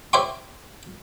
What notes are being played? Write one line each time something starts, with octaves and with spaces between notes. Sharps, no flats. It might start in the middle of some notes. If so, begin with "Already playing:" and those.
C5 D5 E5 G5 C6 C#6